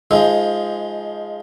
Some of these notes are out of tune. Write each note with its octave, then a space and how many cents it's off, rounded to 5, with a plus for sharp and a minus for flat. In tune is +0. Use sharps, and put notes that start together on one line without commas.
F3 +0 G#3 +0 D#4 +25